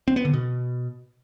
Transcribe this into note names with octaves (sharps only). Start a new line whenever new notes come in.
C4
B3
D3
B2